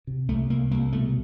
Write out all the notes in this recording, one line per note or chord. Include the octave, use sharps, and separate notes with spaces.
C3
C2 A3
C2 A#3
C2 A#3
B2 A3